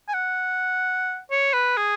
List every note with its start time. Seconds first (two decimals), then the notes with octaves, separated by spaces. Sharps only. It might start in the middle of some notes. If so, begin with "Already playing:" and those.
0.08 G#5
0.14 F#5
1.31 C#5
1.53 B4
1.77 G#4